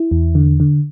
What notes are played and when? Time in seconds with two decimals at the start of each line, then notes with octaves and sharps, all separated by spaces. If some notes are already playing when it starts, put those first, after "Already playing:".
Already playing: E4
0.11 E2
0.35 D3
0.60 D3